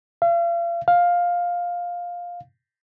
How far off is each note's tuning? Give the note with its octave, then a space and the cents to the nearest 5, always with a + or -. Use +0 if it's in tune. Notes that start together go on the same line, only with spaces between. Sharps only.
F5 -40
F5 +10